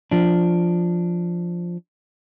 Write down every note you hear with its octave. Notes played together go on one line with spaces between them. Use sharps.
F3 D4